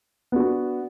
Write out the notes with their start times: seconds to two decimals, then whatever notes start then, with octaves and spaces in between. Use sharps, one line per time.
0.32 B3 D4 F#4